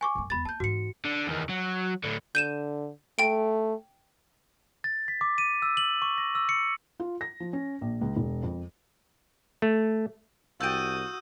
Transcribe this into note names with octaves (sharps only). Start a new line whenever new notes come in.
G#5 C#6 D6
F#2 G#3
E2 G#3 B5 A6
A#3 A5 G6
G#2 E3 F#4 C#7
D3
E2 D#3
F#3
A2 D3
D3 G6 D#7 E7
A3 G5 D7
A6
B6
D6
D#7
E6
F#7
C#6
A#6
E6
C#7
F4
A#6
F3
C#4
A#1
C#2
E1
F2
A3
C2 F#4 G5 A5 D#6 E6 G6 D#7